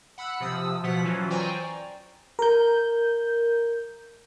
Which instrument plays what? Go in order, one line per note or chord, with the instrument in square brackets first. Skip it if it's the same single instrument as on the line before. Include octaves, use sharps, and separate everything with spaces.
[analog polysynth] F#5 B5 E6 F#6
C3 F3 D#6 E6
B2 F3 F#5 B6
E3 F#3 C#4 F4
C5 D5 G5 G#5 A#5 C#6
[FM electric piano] A#4 G6